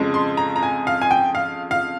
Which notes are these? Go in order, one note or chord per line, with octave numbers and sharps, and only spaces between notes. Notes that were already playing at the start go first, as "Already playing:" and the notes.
Already playing: F2 C#3 G#3
C6
A#5
A#5
G#5
F5
G#5
G5
F5
F5